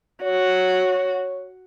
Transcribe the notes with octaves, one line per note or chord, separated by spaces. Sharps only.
F#4 C#5